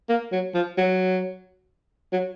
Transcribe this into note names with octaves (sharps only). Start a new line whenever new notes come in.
A#3
F#3
F3
F#3
F#3